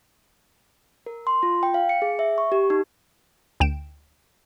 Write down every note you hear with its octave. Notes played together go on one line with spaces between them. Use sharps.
A#4
C6
F4
G5
F5
C#7
G#4
E5
C#6
G4
D#4
D2 G5 D7 E7